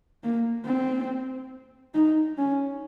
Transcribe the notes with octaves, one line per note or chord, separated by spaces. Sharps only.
A#3
C4
D#4
C#4